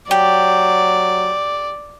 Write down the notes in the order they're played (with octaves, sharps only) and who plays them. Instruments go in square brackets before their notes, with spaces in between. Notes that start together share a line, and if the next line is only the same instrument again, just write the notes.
[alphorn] F#3 [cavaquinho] G4 [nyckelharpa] D5